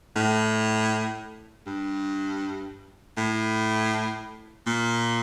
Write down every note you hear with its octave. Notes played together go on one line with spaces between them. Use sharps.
A2
G2
A2
A#2